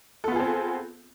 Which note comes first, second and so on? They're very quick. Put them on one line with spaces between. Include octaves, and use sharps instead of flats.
A4 B3 F4 G#4 C4